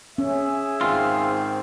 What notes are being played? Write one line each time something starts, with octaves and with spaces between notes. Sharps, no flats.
C#4 G#4 E5
G#2 D#3 C4 F4